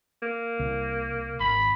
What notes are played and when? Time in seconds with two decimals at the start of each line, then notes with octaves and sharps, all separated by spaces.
0.22 A#3
0.59 C2
1.40 G#1 B5